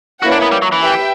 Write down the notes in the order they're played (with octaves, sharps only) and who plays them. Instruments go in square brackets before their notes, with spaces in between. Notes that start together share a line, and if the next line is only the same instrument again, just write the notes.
[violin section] A#3 C#4 E4 B4 F#5 [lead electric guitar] F#4
[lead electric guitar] D4
B3
G3
F#3
E3
[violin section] G4 B4 E5 G5